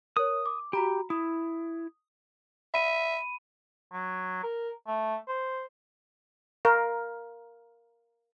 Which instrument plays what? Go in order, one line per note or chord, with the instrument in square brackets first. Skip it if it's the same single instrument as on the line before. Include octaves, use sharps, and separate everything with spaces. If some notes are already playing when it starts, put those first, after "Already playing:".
[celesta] A#4 C#5 [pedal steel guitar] D#6
[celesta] D6
[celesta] F#4 A#5 B5 [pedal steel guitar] G4
[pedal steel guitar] E4 [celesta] D#6
[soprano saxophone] E5 [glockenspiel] B5 D#7
[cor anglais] F#3
A#4
A3
C5
[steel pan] A#4 F5